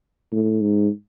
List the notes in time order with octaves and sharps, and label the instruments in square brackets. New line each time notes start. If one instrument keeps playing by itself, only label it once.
[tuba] A2
G#2